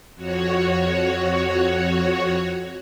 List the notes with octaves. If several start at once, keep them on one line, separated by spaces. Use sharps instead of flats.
F2 F#4 C#5